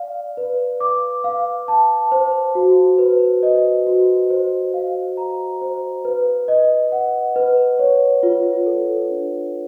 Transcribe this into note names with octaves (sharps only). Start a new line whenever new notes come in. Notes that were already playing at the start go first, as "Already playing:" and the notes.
Already playing: D5 F5
B4
D6
F5
A5
C5
F#4
B4
D#5
F#4
C5
F5
A#5
C5
B4
D#5
F#5
B4
C#5
F4
A4
D4